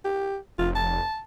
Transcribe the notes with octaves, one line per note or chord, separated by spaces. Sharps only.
G4
F1 F4
A5